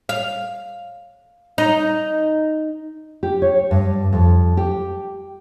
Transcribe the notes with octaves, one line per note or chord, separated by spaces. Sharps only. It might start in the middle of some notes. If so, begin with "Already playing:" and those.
F5
D#4
G4
C#5
G2
F2
G4